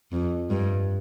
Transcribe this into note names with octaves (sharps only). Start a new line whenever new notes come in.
F2
G2